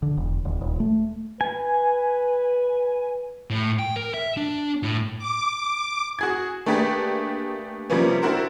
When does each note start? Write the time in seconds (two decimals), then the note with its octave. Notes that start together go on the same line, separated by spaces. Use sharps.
0.02 D3
0.17 E1
0.45 D#1
0.61 D#1
0.80 A3
1.41 B4 G#5
3.50 A2
3.79 G5
3.96 A#4
4.14 E5
4.37 D4
4.83 A2
5.18 D6
6.19 F#4 G#4 G#6
6.66 A3 A#3 D4 G4 G#4 B4
7.90 C3 F3 G3 A#3 B3 C#4
8.22 C4 D4 E4 F#4 A#4 C5